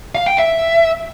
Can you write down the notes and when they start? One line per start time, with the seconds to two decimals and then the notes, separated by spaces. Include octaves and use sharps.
0.15 F5
0.26 G5
0.38 E5